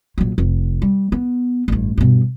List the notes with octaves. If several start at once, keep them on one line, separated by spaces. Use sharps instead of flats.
A#1 F#3
F1
G3
B3
A1 G2
G2 B2